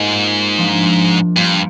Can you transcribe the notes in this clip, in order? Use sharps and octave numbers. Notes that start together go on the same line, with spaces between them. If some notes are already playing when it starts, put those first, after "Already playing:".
Already playing: G#2 A#3 F4 G4 A#4 D#5
F3 A#3 D4
G2 A#3 F4 C5 F5